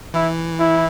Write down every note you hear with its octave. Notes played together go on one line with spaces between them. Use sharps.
E3 E4
E4